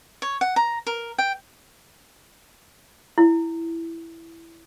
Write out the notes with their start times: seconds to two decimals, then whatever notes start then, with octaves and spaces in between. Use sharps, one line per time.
0.22 C#5
0.41 F#5
0.56 A#5
0.87 A#4
1.18 G5
3.18 E4